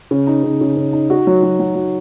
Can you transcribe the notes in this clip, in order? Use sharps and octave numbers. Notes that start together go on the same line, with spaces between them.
C#3
D#4
C#3
C#3
C#3
D#4
F#4
F#3
F#3
F#3
F#3